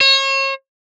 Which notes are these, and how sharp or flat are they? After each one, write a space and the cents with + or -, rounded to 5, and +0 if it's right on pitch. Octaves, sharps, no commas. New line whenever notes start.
C#5 -35